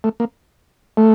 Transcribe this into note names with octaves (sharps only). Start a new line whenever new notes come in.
A3
A#3
A3